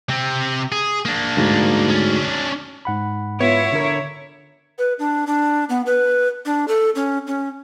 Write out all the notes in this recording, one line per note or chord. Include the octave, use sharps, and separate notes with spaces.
C3 C4
G#4
A#3 D4
D2 G#2
C#4 D4
G#2 F#5 B5
B3 E4 F4 C#5
D3 A#4
B4
D4
D4
B3
B4
D4
A4
C#4
C#4